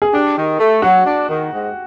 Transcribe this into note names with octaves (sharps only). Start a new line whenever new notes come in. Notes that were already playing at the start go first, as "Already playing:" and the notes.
G#4
D4 G4
D#3
A3
F#3 F#4
D4
D#3
G#2